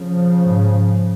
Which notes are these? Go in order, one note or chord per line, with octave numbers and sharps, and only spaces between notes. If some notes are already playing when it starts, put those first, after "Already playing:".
Already playing: C#3 F3
G#2